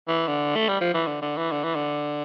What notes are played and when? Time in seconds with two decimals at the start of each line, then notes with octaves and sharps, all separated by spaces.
0.08 E3
0.28 D3
0.56 A3
0.68 G3
0.81 F3
0.94 E3
1.07 D3
1.22 D3
1.37 E3
1.51 D3
1.63 E3
1.75 D3